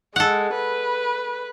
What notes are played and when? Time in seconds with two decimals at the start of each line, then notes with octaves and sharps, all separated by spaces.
0.16 G#3 A4 F#5
0.55 B4